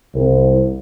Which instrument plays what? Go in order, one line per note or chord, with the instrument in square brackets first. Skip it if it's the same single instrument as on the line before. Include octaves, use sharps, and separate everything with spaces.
[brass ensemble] C2